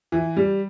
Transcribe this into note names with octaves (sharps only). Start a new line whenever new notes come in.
E3
G3